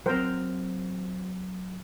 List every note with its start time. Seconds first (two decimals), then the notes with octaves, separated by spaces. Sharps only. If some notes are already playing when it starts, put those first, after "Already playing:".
0.06 F#3 C4 A#4 C5 G5